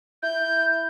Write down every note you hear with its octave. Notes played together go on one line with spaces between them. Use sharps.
E4 G6